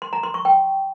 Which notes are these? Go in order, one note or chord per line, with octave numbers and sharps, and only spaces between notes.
C6
A#5
C6
C#6
G5